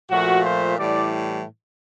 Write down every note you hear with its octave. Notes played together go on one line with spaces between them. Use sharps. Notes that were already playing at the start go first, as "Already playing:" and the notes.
A#2 F3 A3 F#4
C5
A2 E3 G3 D5